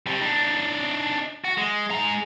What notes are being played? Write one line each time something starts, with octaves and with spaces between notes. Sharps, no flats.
C3 G3
D4 D#4
F#4
G#3
G#3 A#5